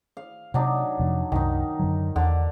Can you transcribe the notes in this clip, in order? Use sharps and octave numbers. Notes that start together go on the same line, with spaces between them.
F5
C3 F#3 D4 D#4
F2 C3 F3
C2 F#2 D#3 D#4
F#2 D3 F#3
E2 D3